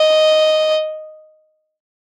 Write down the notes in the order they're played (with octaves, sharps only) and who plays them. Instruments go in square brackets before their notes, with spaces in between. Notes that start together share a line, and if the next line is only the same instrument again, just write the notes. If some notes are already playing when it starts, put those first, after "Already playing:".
Already playing: [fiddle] D#5